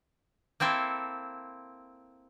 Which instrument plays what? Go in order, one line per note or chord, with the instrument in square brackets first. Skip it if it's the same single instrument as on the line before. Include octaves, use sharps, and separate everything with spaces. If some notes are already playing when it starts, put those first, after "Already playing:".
[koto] A#3 C4 E4 A4